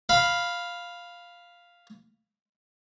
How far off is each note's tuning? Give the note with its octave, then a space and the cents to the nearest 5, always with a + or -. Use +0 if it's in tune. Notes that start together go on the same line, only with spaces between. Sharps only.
F5 +0 B5 +0